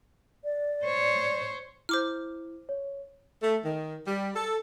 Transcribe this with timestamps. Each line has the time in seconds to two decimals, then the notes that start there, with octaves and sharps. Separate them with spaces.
0.44 D5
0.85 C5 C#5
1.89 E4 C5 D6 F6
2.69 C#5
3.42 A3
3.64 D#3
4.06 G3
4.36 A4